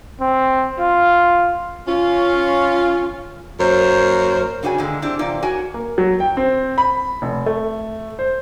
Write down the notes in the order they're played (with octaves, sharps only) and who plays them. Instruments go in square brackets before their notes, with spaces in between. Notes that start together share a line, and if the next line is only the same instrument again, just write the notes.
[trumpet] C4
F4
[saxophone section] C#4 F4
F#2 A#3 A#4 C5
[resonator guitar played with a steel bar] C#3 D4 F#4 G#4 D5 G#5
A#2 D3 D#3 G#3
C4 D4 E4 G4
E2 C3 F4 D5
F#4 A#4 C#5 G#5
[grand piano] A#3
F#3
G5
C4
B5
F1
A3
C5